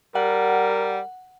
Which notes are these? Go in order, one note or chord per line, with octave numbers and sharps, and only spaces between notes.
G3 A#4 F#5